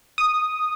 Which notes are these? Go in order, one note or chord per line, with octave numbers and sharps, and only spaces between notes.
D#6